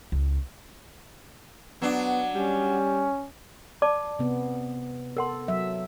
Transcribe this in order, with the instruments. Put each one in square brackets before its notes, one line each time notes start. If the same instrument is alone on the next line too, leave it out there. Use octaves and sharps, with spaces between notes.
[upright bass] C#2
[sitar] F#3 D4 [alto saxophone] B3
[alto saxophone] G3 [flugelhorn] C#4
[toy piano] D5 A5 D6
[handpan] C3 B3
[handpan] A4 [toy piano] A#4 F#5 C6
[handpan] F#3 E5